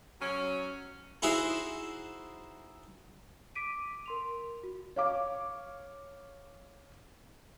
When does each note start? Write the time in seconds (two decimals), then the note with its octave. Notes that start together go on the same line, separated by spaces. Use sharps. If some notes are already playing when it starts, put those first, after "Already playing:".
0.21 F#3 C#4
1.22 D#4 E4 F#4 G#4 C5 E5
3.55 D6 B6 D7 D#7
4.06 A#4 C6 F7
4.63 F#4
4.96 C#5 F5 D6